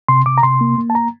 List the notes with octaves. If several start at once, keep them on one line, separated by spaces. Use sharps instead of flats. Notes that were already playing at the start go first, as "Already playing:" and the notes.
C3 C6
C3 D6
A#5
C3 C6
A#3
A#3
A5
A#5